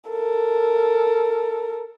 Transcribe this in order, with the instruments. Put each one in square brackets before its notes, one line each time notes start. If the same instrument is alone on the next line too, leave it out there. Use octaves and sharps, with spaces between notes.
[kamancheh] A4 A#4